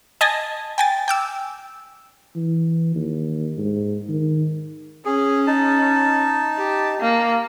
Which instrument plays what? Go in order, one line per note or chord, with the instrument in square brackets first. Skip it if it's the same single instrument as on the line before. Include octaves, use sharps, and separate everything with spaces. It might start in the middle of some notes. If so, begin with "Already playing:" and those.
[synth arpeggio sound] D#5 G#5 A5 A#6
G5 G#5 A6
G5 D6 E6
[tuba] E3
D#2
G#2
D#3
[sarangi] C#4 [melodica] G#4
[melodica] D#4 A5
[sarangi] G4
A#3